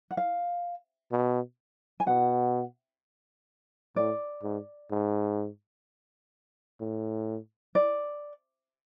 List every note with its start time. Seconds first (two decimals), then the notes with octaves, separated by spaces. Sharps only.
0.11 F#5
0.17 F5
1.12 B2
2.00 G#5
2.07 B2 F#5
3.96 A2 D5
4.43 G#2
4.91 G#2
6.81 A2
7.75 D5